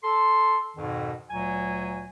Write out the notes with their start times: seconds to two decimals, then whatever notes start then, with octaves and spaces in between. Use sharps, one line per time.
0.03 A4 C6
0.77 F2 G#2 B2 D#3
1.30 D2 A#2 F#3 G#5